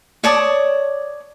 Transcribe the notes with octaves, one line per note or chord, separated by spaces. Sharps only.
C#5 D5 A5 D#6